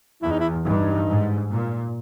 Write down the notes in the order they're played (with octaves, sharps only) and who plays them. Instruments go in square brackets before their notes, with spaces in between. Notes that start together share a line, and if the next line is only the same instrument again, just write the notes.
[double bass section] E2 [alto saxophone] E4
[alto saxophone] D#4
E4
[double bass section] G2 [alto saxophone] D#4
[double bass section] G#2
A#2